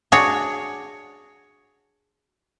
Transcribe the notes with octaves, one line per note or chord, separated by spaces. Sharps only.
D4 F#4 G#4 C#5